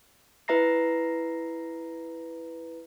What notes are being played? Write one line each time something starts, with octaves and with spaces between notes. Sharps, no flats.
E4 B4 E5 A#5 A#6 C7